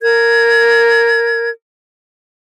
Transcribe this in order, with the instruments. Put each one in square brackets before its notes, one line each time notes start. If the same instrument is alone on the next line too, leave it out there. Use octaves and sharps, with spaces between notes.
[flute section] A#4 G#6